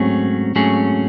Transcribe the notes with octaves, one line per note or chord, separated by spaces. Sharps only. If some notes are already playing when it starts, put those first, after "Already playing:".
Already playing: G#2 F#3 A3 C4 C#4 G#4
G#2 F#3 A3 C#4 G#4